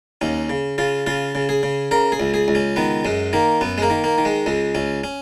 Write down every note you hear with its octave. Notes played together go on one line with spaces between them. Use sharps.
D#2 C#4
C#3
C#3 F4
C#3 F4
C#3
G#4
C#3
C#3 A#4
G#4
C#2
G#4
C#2
C#4
D#3 B3
F#2 G#3
D#3 A#3
F#2 B3
G#3
A#3
D#3
A#3
D#3
G#3
C#2 G#3
C#2 C#4
C#4